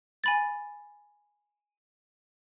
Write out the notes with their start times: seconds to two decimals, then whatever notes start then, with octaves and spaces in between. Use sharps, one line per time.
0.24 G#5 B5 A6